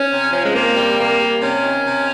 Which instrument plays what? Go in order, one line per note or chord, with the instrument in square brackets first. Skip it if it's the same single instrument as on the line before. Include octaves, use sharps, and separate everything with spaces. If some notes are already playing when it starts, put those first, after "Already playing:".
Already playing: [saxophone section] C#4
C3
F3
G#3
C3 A#3
G3
C3 A#3
G3
C3 C#4
D#3
C3